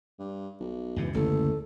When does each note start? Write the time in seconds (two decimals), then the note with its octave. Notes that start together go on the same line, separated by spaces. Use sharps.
0.19 G2
0.60 B1
0.96 C#2 F#2 C3 E3
1.15 A1 D2 A#3 A4